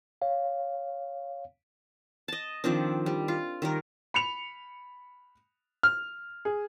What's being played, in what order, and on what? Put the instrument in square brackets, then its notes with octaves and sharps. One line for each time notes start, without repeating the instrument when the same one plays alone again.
[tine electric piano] C#5 F5
[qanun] D#5 A5
D#3 F3 C4 D4
G3
F4
D#3 G3 A#4
[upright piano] B5 C#7 F7
F6
G#4